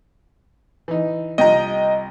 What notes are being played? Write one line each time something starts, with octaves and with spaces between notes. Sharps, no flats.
E3 D#4
C2 F3 D#5 G5 A#5